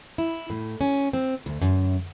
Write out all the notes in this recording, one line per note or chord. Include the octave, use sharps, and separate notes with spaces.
E4
A2
C#4
C4
D2
F#2